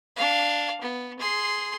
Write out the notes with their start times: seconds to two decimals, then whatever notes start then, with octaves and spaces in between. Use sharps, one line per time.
0.16 D4 F5
0.81 B3
1.19 G#4 C6